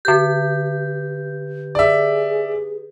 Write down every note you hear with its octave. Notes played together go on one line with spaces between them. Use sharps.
D3 G4 B4 G6
G#4 D5 E5